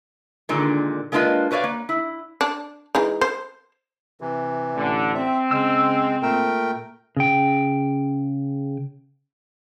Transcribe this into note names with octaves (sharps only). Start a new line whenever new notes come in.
A#2 D3 D#3 G#3
G#3 A#3 D4 F4 B4 D#5
F#4 B4 C#5 D5 F5
A#3
E4
D4
E3 G#3 D#4
C5
C3 E3
A1 D3
C4 E5
C#3 G#3 E6
A#2 A3 A#4 G5
C#3 G5